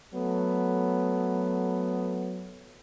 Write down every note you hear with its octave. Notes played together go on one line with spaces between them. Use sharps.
F#3 A3 B3